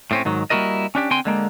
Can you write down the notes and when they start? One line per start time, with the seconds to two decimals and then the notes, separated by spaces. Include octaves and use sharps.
0.11 A2 C4 C#4
0.25 G#2 D#3 F#3
0.50 G3 A#3 E4 F#4 A#4 D#5
0.95 C#4 D4 G4
1.11 D3 C4 G5 G#5 C6
1.25 D3 G#3 A#3